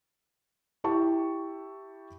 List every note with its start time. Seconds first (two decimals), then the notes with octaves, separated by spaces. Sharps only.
0.84 E4 G4 A5 C#6